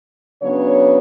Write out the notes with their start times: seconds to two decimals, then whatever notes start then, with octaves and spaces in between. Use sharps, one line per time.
0.42 C#3 F#3 B3 D4 C#5